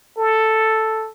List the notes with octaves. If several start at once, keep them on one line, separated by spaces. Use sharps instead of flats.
A4